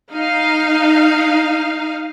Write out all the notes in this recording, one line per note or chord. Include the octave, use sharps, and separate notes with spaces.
D#4 F5